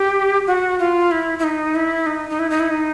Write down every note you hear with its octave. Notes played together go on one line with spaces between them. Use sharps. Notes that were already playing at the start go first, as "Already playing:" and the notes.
Already playing: G4
F#4
F4
E4
E4
D#4
E4
D#4
D#4
E4
D#4
E4
D#4